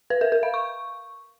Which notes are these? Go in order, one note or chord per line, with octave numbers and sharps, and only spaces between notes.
B4
A#4
A#4
F5
C#6